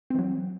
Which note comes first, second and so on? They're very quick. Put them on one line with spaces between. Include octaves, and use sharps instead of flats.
C4 E3 F#3